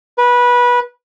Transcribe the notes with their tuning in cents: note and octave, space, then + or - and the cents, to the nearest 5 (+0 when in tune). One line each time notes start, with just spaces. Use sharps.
B4 -20